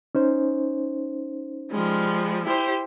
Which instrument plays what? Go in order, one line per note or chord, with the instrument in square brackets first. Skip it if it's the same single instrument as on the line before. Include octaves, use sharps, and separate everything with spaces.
[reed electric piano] C#4 D#4 C5
[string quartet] F3 G3 G#3
E4 G4 C5